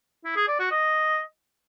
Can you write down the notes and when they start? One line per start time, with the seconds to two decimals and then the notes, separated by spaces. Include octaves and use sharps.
0.25 E4
0.36 G#4
0.48 D5
0.60 F#4
0.71 D#5